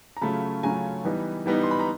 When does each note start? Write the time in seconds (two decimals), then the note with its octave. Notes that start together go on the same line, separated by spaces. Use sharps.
0.17 A#5
0.21 C#3 F#3 A3 C#4 F4 A5 B5
0.63 C#3 F#3 A3 C#4 F4 G#5 A#5
1.05 E3 G3 B3 D#4
1.46 E3 G3 B3 D#4
1.63 C6
1.71 B5
1.80 A#5